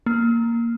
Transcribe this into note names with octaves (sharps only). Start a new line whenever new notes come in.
A#3